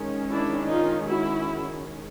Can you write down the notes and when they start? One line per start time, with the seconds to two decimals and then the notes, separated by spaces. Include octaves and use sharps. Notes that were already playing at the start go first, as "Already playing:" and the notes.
Already playing: D#3 G#3 C#4
0.30 D4 E4
0.70 D#4 F4
1.09 E4 F#4